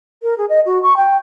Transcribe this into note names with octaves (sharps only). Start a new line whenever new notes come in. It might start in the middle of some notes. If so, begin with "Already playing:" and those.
A#4
G#4
D#5
F#4
C#6
G5